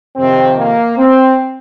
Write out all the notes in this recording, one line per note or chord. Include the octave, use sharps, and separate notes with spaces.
F2 C3 D#3 C4
A#3
C4